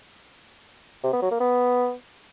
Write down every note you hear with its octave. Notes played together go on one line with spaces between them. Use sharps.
C3
B3
F#3
A#3
B3